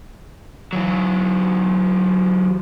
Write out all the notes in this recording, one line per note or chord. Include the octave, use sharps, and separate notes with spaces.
E3 F#3